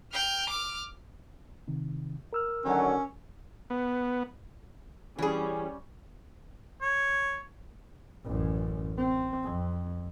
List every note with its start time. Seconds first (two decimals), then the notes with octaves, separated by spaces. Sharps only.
0.13 G5 F6
0.50 D6 F6
1.68 C3 D#3
2.33 A#4 E6 F6
2.65 D3 D#3 F#3 C#4
3.70 B3
5.19 E3 G3 C#4 G#4
6.81 C#5
8.24 A1 F#2
8.97 C4
9.44 F2